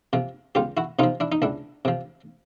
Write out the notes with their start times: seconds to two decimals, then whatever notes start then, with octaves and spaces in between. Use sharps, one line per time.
0.13 C3 F3
0.55 C#2 F4 G4
0.77 E4 F#4
0.99 C3 D#4 F4
1.03 F3
1.20 D4 E4
1.32 D#4
1.42 C#2 D4 E4
1.85 C3 F3